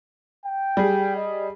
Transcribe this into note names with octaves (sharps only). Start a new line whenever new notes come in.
G5
G3 G#4
D#5